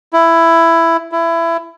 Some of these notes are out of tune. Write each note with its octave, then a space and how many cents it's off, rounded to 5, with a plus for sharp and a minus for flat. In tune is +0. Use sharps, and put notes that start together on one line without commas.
E4 +10
E4 +20